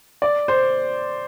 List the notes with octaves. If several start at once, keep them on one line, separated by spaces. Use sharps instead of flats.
D5
C5